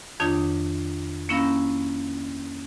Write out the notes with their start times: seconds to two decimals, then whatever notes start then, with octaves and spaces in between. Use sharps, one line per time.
0.20 F2 D#3 D4 F4 C#5 D#6
1.29 A#3 C#4 E4 F5 B5 A#6